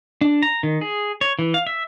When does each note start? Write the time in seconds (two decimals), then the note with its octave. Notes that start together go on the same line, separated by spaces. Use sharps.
0.21 D4
0.43 A#5
0.63 D#3
0.81 G#4
1.21 C#5
1.39 E3
1.54 F5
1.67 E5